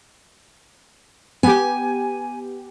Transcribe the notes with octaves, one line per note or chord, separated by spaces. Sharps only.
B3 G4 G#5